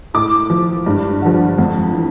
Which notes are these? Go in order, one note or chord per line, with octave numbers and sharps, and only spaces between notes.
A2 D6
F3
G2
D3 F3
F2
E3